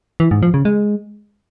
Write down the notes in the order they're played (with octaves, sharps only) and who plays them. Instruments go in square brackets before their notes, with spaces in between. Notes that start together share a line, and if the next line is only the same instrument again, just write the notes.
[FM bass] E3
G#2
F3
C#3
G#3